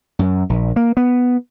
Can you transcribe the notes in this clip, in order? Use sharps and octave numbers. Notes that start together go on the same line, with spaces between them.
F#2
A#1
A#3
B3